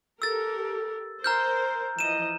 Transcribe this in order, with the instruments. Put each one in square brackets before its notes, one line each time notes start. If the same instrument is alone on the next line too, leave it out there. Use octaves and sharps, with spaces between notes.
[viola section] G4 A4 A#4 [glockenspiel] E6 A6
[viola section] A#4 C5 [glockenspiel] A#5 F6 G6
[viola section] E3 F3 D#5 [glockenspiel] D#7 E7